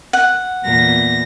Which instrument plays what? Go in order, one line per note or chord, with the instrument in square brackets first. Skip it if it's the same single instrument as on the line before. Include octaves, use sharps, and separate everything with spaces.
[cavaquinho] F#5
[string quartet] E2 A#2 A#6